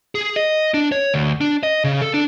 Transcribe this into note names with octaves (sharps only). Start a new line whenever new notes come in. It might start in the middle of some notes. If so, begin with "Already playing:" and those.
G#4
D#5
D4
C#5
D2
D4
D#5
C#3
A4
D4